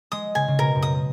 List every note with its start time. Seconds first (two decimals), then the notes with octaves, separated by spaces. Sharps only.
0.12 G#3 D#6
0.35 C#3 G#5
0.48 C#3
0.58 B2 A#4
0.75 F#2
0.82 D#6